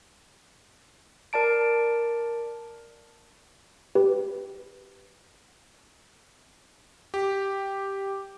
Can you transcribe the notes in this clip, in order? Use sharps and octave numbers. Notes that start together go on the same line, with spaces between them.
A#4 D5 A5 D7
G4 B4
G4